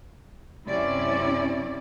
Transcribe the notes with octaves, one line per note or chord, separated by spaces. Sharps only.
F#2 C3 C#4 E4 D5